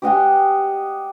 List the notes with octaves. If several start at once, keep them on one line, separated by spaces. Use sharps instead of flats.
G4 D#5 F#5 G#5